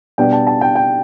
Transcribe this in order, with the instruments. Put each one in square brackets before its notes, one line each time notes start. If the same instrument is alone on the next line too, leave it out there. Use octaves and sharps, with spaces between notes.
[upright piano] B2 G3 B3 D4 [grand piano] G5
[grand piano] A5
A5
G5
G5